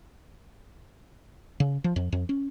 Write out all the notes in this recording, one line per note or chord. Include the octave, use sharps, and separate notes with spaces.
C#3
F3
F2
F2
C#4